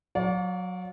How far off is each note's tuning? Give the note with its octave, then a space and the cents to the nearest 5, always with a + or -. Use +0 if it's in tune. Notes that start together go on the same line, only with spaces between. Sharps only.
F#3 -10 D5 -30 F5 +40